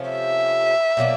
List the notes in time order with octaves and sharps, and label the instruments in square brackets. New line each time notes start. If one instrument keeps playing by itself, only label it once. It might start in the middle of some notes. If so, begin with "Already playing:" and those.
Already playing: [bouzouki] C3 F3 A3 C#4
[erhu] E5
[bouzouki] B2 F#3 A#3 D4